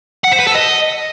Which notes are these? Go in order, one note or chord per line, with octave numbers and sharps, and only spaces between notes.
F#5
C5
B4
A4
D#5